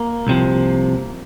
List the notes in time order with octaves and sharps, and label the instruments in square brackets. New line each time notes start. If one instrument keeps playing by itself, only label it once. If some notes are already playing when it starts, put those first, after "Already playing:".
Already playing: [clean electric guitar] A#3
C2 C3 F3